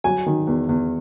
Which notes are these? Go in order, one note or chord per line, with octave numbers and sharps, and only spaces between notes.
F#3 G#5
D#3
E2
E2